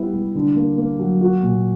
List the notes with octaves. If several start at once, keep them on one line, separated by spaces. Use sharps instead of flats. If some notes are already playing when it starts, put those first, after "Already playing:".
Already playing: G3 B3 E4
G3
D3
A#3
A#3
F#3
F#4
A#2